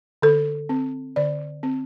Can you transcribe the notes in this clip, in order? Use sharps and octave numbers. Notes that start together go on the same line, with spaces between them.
D3 A4
C4
D3 D5
C4